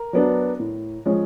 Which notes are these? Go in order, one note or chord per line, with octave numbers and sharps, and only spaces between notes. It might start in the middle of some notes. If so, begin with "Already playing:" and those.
Already playing: A#4
F#3 B3 D4
A2
F3 G#3 C#4